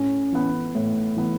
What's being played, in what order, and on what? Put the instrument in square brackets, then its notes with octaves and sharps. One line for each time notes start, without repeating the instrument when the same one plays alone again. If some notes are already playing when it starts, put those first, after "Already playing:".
Already playing: [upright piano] A2 [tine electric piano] C#4
[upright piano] E3 B3
[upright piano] A2 [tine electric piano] A3
[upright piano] E3 B3